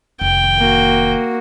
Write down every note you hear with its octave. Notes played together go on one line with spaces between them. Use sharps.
F1 D#3 G5
A#3 F#4